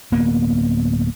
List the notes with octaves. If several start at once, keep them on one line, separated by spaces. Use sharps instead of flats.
D1 A#3 B3